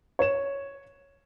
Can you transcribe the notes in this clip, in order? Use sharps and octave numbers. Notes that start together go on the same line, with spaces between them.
C#5 E7